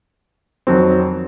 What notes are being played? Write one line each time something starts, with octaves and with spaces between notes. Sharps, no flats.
F2 D#3 F#3 C4